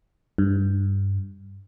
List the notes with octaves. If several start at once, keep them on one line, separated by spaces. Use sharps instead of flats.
G2